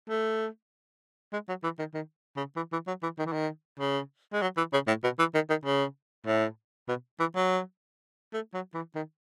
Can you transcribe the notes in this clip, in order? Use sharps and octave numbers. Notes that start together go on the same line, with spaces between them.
A3
G#3
F#3
E3
D#3
D#3
C#3
E3
E3
F#3
E3
D#3
E3
D#3
C#3
G#3
F#3
E3
C#3
A2
B2
E3
D#3
D#3
C#3
A2
B2
E3
F#3
A3
F#3
E3
D#3